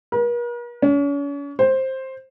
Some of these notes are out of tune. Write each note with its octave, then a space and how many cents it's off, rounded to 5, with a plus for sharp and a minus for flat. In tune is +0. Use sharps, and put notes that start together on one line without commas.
A#4 +45
C#4 +40
C5 +10